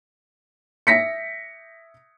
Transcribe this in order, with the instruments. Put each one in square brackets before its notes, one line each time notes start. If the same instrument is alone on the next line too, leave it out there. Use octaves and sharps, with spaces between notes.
[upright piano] E5 A#6 B6 C#7